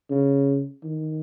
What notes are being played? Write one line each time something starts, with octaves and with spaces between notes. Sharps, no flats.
C#3
D#3